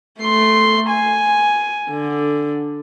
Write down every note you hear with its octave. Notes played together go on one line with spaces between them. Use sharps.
A3 C6
G#5
D3